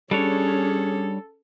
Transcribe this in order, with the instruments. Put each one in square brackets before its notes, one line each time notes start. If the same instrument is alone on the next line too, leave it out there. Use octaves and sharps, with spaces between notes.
[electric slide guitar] G3 D4 C#5 [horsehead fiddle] C#4 G#4 [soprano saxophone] A4